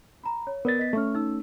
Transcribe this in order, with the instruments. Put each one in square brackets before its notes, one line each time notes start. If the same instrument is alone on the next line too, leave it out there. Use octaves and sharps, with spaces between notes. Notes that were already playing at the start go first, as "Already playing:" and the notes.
[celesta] A#5 B5
C#5
[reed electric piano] B3 A6 [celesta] A#4 D5
[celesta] D#5 B6
[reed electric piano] A3 C#4 [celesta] E5 C#6 F6
[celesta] D#4 E6